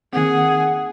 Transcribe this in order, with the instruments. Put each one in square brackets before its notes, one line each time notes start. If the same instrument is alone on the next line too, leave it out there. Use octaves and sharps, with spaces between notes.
[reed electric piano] D#3 A#3 C4 [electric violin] G#4 [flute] F#5